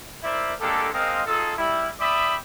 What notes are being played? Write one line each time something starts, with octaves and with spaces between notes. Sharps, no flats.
E4 A#4 C5 D5 E5
G#3 A#3 D4 G4 A4
G#3 C4 A#4 D#5 F5
D#4 F4 G#4 A4
G3 E4
D5 E5 G5 B5 D6 D#6